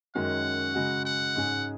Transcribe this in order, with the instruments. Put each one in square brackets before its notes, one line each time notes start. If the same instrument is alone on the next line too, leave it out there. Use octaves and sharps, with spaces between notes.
[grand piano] F#2 D#3 G#3 C#4 F#4 [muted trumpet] F#5
[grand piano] C#3 G#3 F#4
[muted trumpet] F#5
[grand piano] G#2 G#3 C#4 G#4